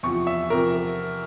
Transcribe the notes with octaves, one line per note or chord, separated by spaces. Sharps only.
E2 C3 F3 C#6
E5
C3 F3 A#4